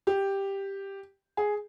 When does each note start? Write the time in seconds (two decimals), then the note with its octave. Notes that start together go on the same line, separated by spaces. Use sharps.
0.07 G4
1.37 G#4